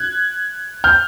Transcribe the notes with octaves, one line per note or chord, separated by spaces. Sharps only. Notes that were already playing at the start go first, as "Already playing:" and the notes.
Already playing: F#6 G#6
F6 G6